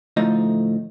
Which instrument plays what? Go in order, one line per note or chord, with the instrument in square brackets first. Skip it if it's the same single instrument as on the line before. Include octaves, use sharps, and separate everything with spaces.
[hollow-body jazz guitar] D2 A2 F3 D#4